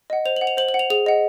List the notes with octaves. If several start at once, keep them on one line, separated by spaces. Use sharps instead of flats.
D#5 F#5
C5 F7
F#7
F#5
F7
C5 F#7
F#7
F#5
F7
G#4 F7
D#5 F#5